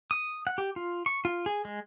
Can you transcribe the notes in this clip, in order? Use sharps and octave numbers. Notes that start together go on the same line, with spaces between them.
D#6
F#5
G4
F4
C#6
F4
G#4
G#3